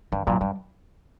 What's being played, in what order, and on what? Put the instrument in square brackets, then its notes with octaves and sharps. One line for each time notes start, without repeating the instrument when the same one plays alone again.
[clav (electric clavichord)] G2 [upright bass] D#3
[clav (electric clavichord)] G2 A#2 [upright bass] F#3
[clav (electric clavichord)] G2 [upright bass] G3